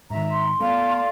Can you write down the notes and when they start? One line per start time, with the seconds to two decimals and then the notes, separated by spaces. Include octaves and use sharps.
0.10 G#2 D#3 E5 A#5
0.30 C6
0.60 A3 B3 A4 D5 F5